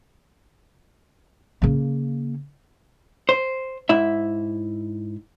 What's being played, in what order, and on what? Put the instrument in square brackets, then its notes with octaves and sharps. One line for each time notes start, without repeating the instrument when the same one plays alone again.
[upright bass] C#3 A#3
[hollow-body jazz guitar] C5
G#2 E4 E5